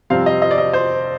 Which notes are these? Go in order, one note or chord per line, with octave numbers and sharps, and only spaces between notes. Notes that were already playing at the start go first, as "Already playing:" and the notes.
F2 C3 G3 C4 F5
D#5
D#5
D5
D#5
C5